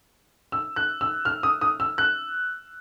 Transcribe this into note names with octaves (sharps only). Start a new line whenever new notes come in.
E6
F#6
E6
F6
D#6
D#6
E6
F#6